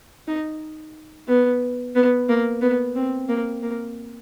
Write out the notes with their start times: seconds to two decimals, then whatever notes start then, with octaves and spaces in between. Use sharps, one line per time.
0.27 D#4
1.28 B3
1.95 B3
2.29 A#3
2.62 B3
2.95 C4
3.29 A#3
3.62 A#3